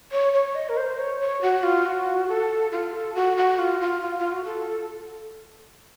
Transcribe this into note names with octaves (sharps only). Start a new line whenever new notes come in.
C#5
C#5
D#5
A#4
C5
C#5
C#5
F#4
F4
F#4
A4
F4
A4
F#4
F#4
F4
F4
F4
F4
F#4
A4